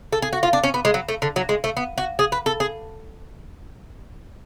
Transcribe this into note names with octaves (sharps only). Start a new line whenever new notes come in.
A4
G#4
F#4
F4
D4
C#4
B3
G#3
F#3
A3
D3
F#3
G#3
A3
B3
F#4
G#4
B4
A4
G#4